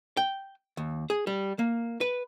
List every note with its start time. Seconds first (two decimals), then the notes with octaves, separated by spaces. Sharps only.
0.17 G5
0.77 D#2
1.10 G#4
1.27 G3
1.59 A#3
2.01 B4